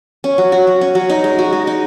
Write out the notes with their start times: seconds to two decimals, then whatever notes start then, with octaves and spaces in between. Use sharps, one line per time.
0.24 C#4
0.38 F#3
0.52 F#4
0.67 F#3
0.81 C#4
0.95 F#3
1.09 D#4
1.24 G#3
1.39 F#4
1.53 G#3
1.67 D#4